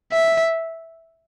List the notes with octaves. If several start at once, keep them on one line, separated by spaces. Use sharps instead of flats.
E5